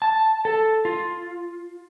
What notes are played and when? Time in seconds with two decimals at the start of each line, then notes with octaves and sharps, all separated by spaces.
0.02 A5
0.45 A4
0.85 F4